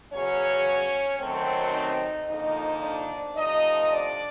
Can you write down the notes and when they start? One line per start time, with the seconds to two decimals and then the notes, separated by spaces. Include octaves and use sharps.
0.10 E2 C#3 F#3 C#4 C#5
1.19 F#2 D#3 F#3 A3 C4
1.73 D#4 D#5
2.28 F2 D3 F3 A#3 D#4
2.82 D4 D5
3.36 C3 F3 A3 D#4 D#5
3.91 D4 D5